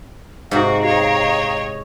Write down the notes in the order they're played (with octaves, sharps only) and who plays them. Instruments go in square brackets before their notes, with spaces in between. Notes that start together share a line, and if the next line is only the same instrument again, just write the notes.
[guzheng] G#2 C3 [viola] F#4 [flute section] F5 G5 A#5
[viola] C#5 D#5